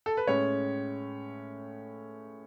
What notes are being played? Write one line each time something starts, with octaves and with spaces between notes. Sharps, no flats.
A4
B4
A2 G#3 C#4 C#5